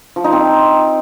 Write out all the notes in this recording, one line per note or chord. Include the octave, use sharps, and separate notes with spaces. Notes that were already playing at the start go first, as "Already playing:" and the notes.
F3
D#4
C4